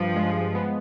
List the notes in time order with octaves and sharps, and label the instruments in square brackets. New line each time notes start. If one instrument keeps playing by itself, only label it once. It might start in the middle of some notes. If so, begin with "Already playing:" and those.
Already playing: [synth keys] G2 [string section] F3
[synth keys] G#3
B3